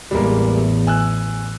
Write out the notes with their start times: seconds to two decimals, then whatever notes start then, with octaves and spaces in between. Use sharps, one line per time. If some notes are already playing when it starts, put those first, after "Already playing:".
0.11 A1 E2 G3 G#3 A#3
0.87 G#5 E6 F#6